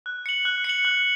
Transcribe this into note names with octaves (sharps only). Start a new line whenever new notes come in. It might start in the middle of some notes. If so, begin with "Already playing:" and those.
F#6
C#7 F#7
F#6
C#7
F#7
F#6